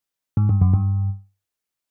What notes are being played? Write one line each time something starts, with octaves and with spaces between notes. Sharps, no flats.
G#2
G2
F#2
G2